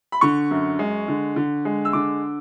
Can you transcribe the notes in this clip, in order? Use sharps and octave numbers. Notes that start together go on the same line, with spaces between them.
B5
D3 C#6
F#2
G#3
D3
D3
G#3
E6
D3 D6